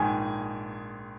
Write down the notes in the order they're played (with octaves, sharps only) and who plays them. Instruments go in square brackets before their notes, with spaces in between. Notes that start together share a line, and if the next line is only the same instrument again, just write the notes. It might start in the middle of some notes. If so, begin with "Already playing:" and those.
Already playing: [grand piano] A#1 G#2 D#3 G#5